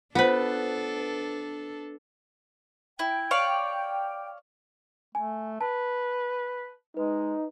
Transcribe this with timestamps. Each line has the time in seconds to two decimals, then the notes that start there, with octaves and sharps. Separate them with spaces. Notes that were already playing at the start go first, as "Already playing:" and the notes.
0.15 B3 D4 F4 A4 B4 C5
2.99 E4 G5
3.31 C#5 D5 F5
5.15 A3 G#5
5.61 B4 A5
6.97 G#3 D#4 B4